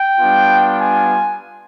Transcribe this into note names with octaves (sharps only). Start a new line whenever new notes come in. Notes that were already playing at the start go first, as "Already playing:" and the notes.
Already playing: G5
G3 B3 D4 F4
G#5